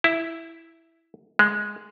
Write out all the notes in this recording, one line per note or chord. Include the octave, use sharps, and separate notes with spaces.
E4
G#3